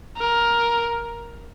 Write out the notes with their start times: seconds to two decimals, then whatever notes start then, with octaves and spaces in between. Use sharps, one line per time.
0.17 A#4